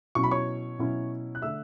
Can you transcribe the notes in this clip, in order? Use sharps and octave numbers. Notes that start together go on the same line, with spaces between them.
B2 F#3 C#4 E4 C#6
B5
C#5 C#6
B2 F#3 C#4 E4
F#6
D3 A3 D4 E5 E6